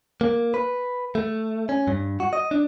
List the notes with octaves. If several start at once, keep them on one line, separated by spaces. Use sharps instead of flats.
A#3
B4
A3
C#4
G2
F#4
D#5
D4